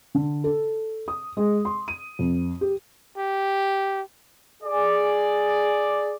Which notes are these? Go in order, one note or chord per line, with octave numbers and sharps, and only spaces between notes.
D3
A4
D#6
G#3
C6
D#7
F2
G4
G4
G#4 D5